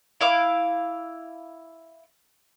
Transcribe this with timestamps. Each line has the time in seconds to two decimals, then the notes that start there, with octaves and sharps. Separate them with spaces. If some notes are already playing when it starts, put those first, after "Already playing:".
0.21 E4 F5 D6